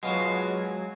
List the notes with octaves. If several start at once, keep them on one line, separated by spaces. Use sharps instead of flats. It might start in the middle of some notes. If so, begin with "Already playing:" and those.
B2 F#3 G#3 F4 F#4